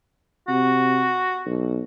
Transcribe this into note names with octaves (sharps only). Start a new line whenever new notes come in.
C3 F#4
B1